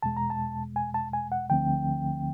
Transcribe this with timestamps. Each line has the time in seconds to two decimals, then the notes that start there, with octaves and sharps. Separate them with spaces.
0.02 E2 B2 G#3 A5
0.17 A#5
0.30 A5
0.76 G#5
0.94 A5
1.13 G#5
1.32 F#5
1.50 D2 D3 F3 A3 C4 G5